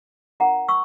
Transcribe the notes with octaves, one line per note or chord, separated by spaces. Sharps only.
C#4 E4 A#4 F#5 A#5
C#6 E6